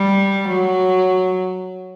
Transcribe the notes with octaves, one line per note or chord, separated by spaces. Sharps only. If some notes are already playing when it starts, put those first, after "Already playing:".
Already playing: G3
F#3